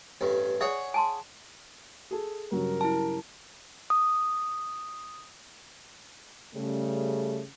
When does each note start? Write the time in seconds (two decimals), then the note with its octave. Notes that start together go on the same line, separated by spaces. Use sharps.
0.21 A1 G2
0.61 G#4 C#5 D5 E5 F#5
0.94 G#5 A5 C6
2.11 G#4 A4
2.52 G2 C#3 F#3 A#4
2.81 E4 A5
3.90 D#6
6.54 C#3 G3 A3